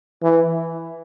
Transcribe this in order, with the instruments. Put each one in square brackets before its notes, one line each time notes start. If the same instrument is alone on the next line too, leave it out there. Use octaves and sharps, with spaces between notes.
[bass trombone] E3